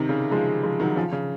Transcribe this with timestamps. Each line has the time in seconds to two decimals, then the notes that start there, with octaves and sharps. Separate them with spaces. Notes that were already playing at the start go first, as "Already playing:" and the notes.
Already playing: C3 D#3
0.09 C#3
0.31 F3 G#3
0.63 F3 G#3
0.80 D#3 F#3
0.96 C#3 F3
1.12 C#3